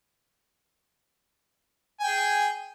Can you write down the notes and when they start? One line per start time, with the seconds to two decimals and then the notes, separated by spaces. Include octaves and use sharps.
2.00 G#5
2.04 G5
2.07 G#4